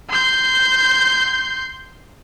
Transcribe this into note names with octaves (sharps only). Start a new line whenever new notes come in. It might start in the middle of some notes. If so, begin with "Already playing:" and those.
C6 G6